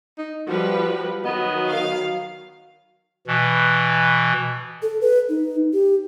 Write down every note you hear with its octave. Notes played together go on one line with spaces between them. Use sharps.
D#4
F3 G3 F#4 B4
D#3 F#3 B3 D#5
F5
B2 E3
A4
B4
D#4
G4